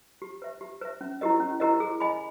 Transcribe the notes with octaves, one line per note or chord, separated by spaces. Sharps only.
G4
B4 E5
G4
B4 E5
C#4
E4 G4 A#4 D#5
C#4
E4 G4 A#4 D#5
G#4
D#5 G#5 B5